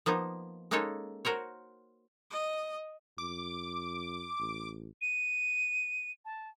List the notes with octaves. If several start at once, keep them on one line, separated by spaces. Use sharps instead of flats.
F3 A#3 B3 D#4
G#3 A#3 C#4 D#4 A4 C#5
F#4 A#4 C5 C#5
D#5
F2 D6
A1
D#7
A5